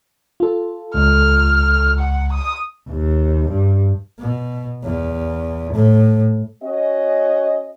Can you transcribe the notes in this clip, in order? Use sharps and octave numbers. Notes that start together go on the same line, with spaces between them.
F4 A4
C#2 F6
F#5
D#6
D#2
G2
B2
E2
A2
C#4 F#4 D#5